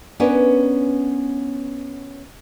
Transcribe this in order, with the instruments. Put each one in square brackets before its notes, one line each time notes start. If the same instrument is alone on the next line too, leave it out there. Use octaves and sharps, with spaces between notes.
[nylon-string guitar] B3 C#4 D4 A#4 B4 C#5